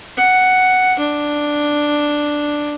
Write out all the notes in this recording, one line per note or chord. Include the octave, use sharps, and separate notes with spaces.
F#5
D4